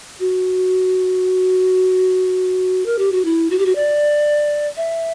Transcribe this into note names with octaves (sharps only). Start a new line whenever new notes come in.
F#4
A#4
G4
F#4
E4
F#4
G4
F#4
D5
E5